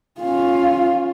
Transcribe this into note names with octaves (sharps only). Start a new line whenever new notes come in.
C#4 F4